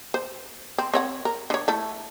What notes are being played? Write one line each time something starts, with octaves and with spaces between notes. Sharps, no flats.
C5
C4
C4 C#5 F#5
A#4
D3 C#5
A3 E4 A4